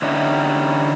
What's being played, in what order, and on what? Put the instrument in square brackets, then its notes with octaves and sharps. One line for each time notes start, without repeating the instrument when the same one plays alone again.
[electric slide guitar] D3 C#4 D#4 E4 G4